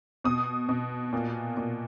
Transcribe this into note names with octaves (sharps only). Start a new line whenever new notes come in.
B2 D#6
B2
A#2
A#2